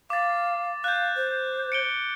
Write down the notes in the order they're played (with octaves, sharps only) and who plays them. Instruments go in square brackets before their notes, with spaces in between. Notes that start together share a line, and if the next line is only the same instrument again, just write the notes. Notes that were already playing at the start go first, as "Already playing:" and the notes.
[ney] F5 [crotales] D6 A6
[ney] F5 [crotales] F#6 G6
[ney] C5
[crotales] C#7 D7 G7